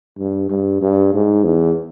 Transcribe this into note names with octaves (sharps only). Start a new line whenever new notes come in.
G2
G2
G2
G#2
E2